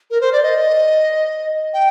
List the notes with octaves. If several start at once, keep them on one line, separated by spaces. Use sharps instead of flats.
A#4
C5
D5
D#5
G5